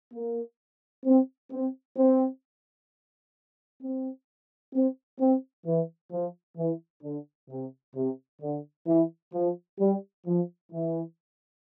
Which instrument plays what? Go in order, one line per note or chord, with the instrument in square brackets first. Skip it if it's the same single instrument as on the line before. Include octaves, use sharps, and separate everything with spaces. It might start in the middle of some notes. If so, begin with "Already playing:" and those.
[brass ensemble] A#3
C4
C4
C4
C4
C4
C4
E3
F3
E3
D3
C3
C3
D3
E3
F3
G3
F3
E3